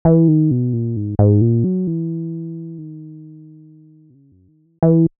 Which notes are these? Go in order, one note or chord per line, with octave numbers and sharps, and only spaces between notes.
E3
D#3
B2
A#2
G#2
G#2
A#2
F#3
E3
D#3
B2
C#3
F#2
D#3
E3
E3